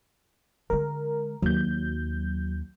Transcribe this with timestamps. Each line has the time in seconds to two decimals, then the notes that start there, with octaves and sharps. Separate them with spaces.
0.70 D3 G#3 A#4
1.42 D#2 F#3 G6